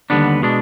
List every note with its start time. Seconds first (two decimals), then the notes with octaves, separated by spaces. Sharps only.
0.10 D#2 D3 G3 B3 D4
0.43 B2 G#3 D4